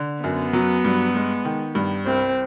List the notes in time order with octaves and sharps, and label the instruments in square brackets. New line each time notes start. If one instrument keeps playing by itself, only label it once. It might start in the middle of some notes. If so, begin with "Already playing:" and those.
Already playing: [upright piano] D3
[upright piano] F#2 [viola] B3
[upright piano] F#3
G2
G#3
D#3
G2
[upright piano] C2 [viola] C4